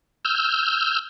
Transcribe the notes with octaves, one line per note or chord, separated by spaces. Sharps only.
E6 F6 G6